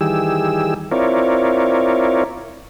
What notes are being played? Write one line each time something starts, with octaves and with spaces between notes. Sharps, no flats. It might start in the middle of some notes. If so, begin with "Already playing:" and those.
D#3 E3 G3 G4 G#4 E6
C4 E4 F4 A#4 C#5 D5